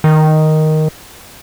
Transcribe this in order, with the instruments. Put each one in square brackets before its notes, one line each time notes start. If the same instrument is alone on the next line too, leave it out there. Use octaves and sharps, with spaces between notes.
[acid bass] D#3